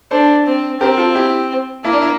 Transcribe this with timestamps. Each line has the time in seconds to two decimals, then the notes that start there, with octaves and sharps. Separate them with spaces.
0.11 D4 A4 C5
0.47 C4
0.81 C4 G4 A#4
0.98 F4 A4
1.15 E4 G4
1.85 A#3 E4
1.93 D4
2.02 E4